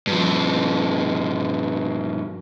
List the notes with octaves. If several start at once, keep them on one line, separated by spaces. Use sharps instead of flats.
G2 F3